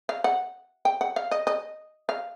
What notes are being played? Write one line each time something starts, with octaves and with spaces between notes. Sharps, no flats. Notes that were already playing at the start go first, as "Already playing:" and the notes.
F5
F#5
G5
F#5
F5
D#5
D#5
F5